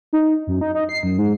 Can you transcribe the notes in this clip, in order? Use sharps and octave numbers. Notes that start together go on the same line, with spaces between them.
D#4
F#2
D#4
D#4
C7
F#2
G#2